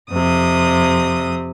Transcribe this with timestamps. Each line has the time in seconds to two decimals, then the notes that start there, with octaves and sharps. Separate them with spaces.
0.11 F2 C3 D#6